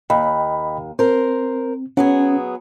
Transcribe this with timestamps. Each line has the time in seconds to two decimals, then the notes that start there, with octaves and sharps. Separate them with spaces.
0.10 D#2 D#5 G5 B5
0.99 C4 A#4 C5
1.97 F#3 B3 C#4 G#4